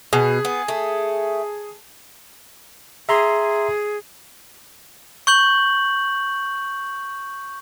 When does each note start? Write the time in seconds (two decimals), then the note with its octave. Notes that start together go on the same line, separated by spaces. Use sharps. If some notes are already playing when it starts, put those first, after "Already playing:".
0.13 B2 G#4
0.45 B3
0.68 A3
3.09 G#4 E5 A#5 C6
5.27 C#6 G6 F#7